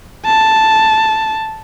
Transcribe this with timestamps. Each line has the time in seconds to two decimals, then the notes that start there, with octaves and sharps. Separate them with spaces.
0.25 A5